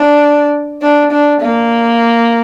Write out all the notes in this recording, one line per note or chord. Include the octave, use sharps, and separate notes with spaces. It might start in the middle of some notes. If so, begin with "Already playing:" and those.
Already playing: D4
D4
D4
A#3